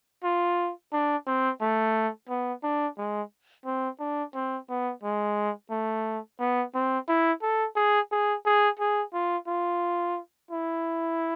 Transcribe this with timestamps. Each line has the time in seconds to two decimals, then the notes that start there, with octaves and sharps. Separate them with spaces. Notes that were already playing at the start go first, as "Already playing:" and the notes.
0.24 F4
0.93 D4
1.27 C4
1.61 A3
2.29 B3
2.63 D4
2.98 G#3
3.66 C4
4.00 D4
4.35 C4
4.69 B3
5.04 G#3
5.71 A3
6.40 B3
6.75 C4
7.08 E4
7.42 A4
7.76 G#4
8.12 G#4
8.46 G#4
8.79 G#4
9.13 F4
9.47 F4
10.51 E4